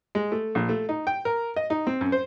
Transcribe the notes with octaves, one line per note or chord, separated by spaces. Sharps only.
G#3
A3
A#1
A3
D#4
G5
A#4
D#5
D#4
C4
F#2
C5